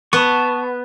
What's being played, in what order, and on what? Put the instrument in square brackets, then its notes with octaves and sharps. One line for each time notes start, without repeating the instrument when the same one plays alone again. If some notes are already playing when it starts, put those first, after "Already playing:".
[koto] B3 [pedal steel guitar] A5 C#6